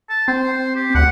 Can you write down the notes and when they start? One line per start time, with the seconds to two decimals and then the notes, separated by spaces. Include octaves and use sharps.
0.09 A5
0.28 C4 C5
0.76 G4
0.95 D2 F#5